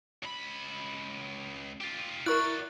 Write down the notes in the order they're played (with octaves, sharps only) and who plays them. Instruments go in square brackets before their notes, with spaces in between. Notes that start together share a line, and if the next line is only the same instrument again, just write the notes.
[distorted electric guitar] C#2 B5
F4 G4
[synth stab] E4 A#4 [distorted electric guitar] F#4 D5 [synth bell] C#6 F#6